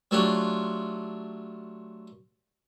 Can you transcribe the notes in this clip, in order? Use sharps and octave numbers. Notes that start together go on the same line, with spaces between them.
F#3 A3 D4 F4 G4